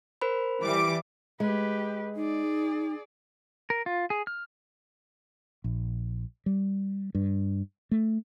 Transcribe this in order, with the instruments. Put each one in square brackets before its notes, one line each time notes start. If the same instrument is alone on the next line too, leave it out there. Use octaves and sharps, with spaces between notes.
[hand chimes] A#4 C5 B5
[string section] E3 G3 D6
[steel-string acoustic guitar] G#3 [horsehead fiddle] G4 B4
[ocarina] D#4 [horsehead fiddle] G#4 D5
[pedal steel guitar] A#4
F4
G#4
F6
[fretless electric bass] A#1
G3
G2
A3